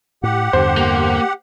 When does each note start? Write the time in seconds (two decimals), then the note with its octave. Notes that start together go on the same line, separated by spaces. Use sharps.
0.23 A2 G4 F#5
0.53 E2 G2 D3 C5
0.77 A#3